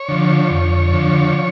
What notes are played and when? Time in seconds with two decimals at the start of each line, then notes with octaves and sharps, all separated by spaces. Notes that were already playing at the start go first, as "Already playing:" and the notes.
Already playing: C#5
0.09 D3 F3
0.51 F2
0.92 D3 F3